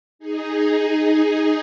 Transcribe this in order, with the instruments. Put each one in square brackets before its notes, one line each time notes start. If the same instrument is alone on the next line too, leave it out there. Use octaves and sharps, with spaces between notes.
[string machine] D#4 G#4